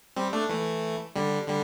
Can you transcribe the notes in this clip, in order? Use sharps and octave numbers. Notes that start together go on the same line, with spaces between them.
G3 C4
A3 D4
E3 A3
D3 G3
D3 G3